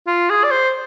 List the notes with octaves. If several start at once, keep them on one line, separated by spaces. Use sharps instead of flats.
F4
G#4
D5
C5